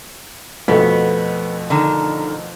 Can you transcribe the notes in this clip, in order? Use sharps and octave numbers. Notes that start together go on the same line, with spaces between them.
F2 B2 A3 B3
D3 D#3